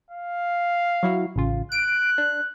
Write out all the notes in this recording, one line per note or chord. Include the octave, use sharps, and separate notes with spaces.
F5
F#3 E4 F#4
A1 C#3 F4
F#6 D7
D4